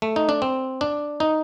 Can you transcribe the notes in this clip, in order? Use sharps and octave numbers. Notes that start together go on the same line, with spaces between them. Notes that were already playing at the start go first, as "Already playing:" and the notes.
A3
D#4
D4
C4
D4
D#4